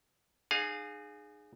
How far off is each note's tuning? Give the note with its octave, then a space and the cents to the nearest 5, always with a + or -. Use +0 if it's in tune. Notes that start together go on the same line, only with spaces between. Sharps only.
D#4 -40 G#4 +0 F5 +30